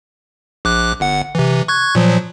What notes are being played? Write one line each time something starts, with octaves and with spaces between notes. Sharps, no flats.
A#1 D6 F#6
G1 F#5
C3 E3
C#6 F#6 G#6
A#2 F3 F#3